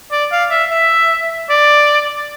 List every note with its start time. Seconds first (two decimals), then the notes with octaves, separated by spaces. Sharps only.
0.12 D5
0.32 F5
0.51 E5
0.70 E5
1.49 D5